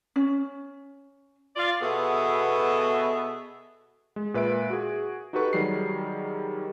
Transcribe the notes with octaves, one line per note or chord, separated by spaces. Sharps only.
C#4
F4 D5 F5
B2 B3 F#4 G#4 A4 E5
G#3
A#2 B4 E5 D7
F#4 G#4
D#4 F#4 G4 A4 B4 C#6
D#3 F#3 G3 G#4 C7